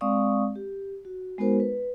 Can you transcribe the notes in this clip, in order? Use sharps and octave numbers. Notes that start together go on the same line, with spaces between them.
G#3 C4 D5 F5 C#6 D#6
G4
F#4
G#3 B3 D#4 F#4 A#4 C5
B4